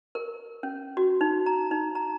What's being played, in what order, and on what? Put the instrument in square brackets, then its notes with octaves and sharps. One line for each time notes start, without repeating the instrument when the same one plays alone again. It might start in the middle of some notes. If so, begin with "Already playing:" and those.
[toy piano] A#4
C#4
F#4
D#4
A#5
D#4
A#5